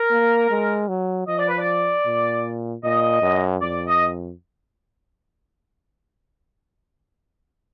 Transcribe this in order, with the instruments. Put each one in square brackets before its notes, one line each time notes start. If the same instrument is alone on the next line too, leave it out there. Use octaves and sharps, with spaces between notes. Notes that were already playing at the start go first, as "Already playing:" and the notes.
Already playing: [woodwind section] A#4
[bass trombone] A#3
G#3
F#3
[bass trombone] F3 [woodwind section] D#5
[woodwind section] D5
B4
D5
[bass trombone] A#2
[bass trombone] A#2 [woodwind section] D#5
[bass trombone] F#2
[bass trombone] F2 [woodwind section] D5
[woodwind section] D#5